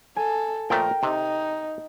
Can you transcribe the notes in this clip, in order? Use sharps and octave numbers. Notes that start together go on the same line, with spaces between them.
A4 G#5
A#2 F3 A3 A#4 G5
C3 D#4